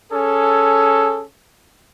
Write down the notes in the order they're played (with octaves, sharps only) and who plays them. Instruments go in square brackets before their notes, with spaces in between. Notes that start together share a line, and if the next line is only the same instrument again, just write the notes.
[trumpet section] C#4 G#4 A4